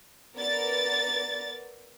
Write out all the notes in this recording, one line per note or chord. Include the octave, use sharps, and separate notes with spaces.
B3 A#4 D5 A6